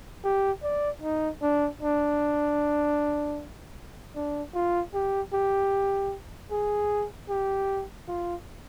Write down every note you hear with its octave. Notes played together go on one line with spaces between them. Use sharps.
G4
D5
D#4
D4
D4
D4
F4
G4
G4
G#4
G4
F4